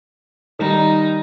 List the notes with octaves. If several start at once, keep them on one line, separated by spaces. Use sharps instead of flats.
D#3 G3 D#4